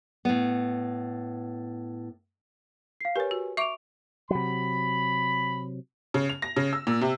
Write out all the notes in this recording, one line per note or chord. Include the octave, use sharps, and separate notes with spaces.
A2 B3
F5 C7
G4 A#4 B4 C#5 G#5
F#4
E5 C#6 D6 D7 F7
C3 F#3 B5
C#3
F7
A#6
C#3
E6
A#2
C3